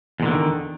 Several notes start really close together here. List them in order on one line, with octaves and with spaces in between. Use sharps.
E2 A#2 D3 F3 D#3